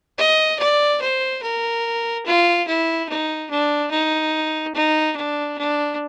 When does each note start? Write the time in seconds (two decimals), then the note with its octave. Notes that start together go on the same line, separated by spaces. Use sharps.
0.18 D#5
0.59 D5
1.01 C5
1.42 A#4
2.26 F4
2.67 E4
3.09 D#4
3.50 D4
3.91 D#4
4.75 D#4
5.16 D4
5.58 D4